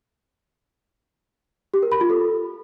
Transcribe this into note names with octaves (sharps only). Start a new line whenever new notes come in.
G4
A#4
B5
F4
A4